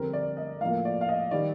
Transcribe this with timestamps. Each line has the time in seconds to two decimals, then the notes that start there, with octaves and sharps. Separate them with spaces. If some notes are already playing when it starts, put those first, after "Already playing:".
Already playing: F2 D3 G3 C4 A#4
0.13 D5
0.37 D#5
0.61 A2 F3 A#3 F5
0.85 D5
1.01 F5
1.09 D#5
1.31 D#3 G3 D5